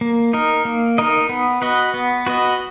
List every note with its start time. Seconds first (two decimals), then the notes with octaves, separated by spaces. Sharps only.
0.01 A#3
0.33 D#4 A#4 D#5
0.65 A#3
0.98 D#4 A#4 D#5
1.29 B3
1.62 F#4 B4 D#5
1.94 B3
2.26 F#4 B4 D#5